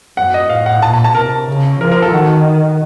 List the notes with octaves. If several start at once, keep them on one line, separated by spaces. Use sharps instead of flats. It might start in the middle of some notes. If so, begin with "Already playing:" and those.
F#2 F#5
D#5
A2 F5
F#5
A#2 A5
A5
A5
C3 A#4
C#3
F3 A#4
A#4
A4
D#3 F#4